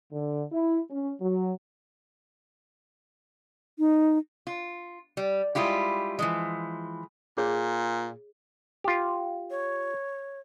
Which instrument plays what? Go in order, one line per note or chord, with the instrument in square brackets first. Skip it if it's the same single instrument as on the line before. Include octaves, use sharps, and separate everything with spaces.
[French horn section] D3
E4
C#4
F#3
[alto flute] D#4
[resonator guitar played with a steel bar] F4
G3
G3 G#3 E4 F4 G4
E3 F3 G#3
[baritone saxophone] A#2 [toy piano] G#4 C#5
[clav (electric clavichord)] F4 G4
[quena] C#5